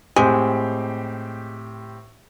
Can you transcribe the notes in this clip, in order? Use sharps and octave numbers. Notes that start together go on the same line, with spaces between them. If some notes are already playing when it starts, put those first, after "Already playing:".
A2 G#3 C4 G4